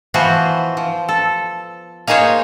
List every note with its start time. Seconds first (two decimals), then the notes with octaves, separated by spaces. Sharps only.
0.14 E3 F3 B3 F#4 C5
0.77 F3
1.09 A4
2.07 A#3 D#4 G#4 C5 C#5